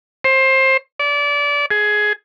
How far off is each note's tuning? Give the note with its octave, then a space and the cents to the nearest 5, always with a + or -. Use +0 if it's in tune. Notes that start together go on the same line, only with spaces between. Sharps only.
C5 +20
D5 -25
G#4 +15